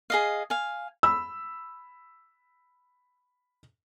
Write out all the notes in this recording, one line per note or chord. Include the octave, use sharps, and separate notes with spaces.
G#4 D#5 F5
F5 G#5
B5 E6